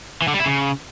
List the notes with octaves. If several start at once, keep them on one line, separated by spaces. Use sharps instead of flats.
E3
D3
G3
E4
C#3